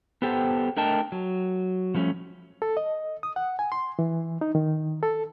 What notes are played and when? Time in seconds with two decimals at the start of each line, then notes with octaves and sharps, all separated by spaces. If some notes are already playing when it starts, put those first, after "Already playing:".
0.22 B3 G4 A4 C5 G5
0.77 A3 D4 A#4 D#5 G5 A5
1.12 F#3
1.94 F3 G3 A3 C#4
2.62 A4
2.77 D#5
3.23 D#6
3.36 F#5
3.59 G#5
3.72 C6
3.99 E3
4.41 D#4
4.55 D#3
5.03 A4